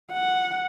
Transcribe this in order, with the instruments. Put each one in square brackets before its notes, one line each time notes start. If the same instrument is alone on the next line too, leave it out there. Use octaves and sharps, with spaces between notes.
[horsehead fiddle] F#5